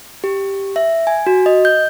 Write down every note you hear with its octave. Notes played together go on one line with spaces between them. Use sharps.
G4
E5
G#5
F#4
D#5
G6